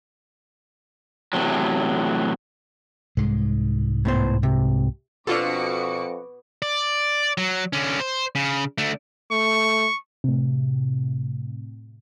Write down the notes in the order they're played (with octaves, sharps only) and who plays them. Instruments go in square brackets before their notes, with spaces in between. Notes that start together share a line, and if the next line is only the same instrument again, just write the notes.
[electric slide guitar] E2 A2 C3 F#3
[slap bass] C2 G#2 G#3
[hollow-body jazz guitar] A2 B3 C5
C3
[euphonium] F2 [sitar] B2 [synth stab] D4 F4 A4 [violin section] F#4 D6 C#7
[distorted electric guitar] D5
F#3
D3 C#4
C5
C#3
D3 A3
[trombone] A3 [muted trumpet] C#6
[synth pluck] A2 C3